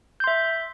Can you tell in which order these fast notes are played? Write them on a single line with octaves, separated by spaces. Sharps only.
G6 C6 E5